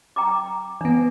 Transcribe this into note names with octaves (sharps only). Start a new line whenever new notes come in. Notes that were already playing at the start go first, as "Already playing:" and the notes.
G5 A#5 D6
E3 B3 D4